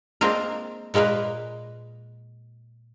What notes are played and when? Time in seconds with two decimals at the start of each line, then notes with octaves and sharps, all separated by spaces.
0.21 G#3 A#3 C4 D4 F4 A#4
0.94 A#2 G#3 A#3 A#4 B4